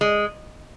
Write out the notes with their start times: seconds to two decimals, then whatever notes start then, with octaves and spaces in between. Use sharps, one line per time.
0.01 G#3